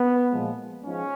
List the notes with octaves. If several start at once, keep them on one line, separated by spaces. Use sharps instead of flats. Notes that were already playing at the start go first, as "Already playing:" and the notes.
Already playing: B3
A#2 F3 G#3
G#2 F3 G#3 C#4